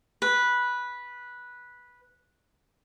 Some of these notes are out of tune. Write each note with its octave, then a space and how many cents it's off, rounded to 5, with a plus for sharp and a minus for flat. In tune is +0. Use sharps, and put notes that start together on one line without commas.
B4 -10